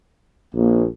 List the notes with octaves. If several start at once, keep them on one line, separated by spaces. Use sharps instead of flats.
A#1 A#3